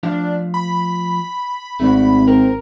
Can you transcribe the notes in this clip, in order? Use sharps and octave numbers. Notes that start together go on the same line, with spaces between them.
F3 A3 D4 F5
B5
G#1 A3 D4 F#4
C4 A#4